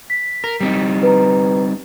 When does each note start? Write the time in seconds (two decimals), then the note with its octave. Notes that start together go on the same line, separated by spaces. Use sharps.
0.10 B6
0.44 A#4
0.60 G3 C4 D#4
1.03 B4 A#5